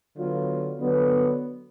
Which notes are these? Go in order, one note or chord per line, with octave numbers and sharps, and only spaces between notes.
D3 F#3 B3 F4
D3 F#3 B3